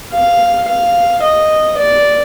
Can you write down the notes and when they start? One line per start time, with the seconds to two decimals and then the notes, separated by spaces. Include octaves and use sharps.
0.13 F5
0.68 F5
1.23 D#5
1.78 D5